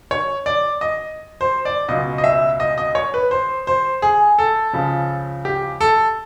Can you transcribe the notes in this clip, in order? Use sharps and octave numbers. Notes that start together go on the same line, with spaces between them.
C#5
D5
D#5
C5
D5
C#2 B2 F#3 D#5
D#5
E5
D#5
D#5
C#5
B4
C5
C5
G#4
A4
C#2 C#3 F3
G4
A4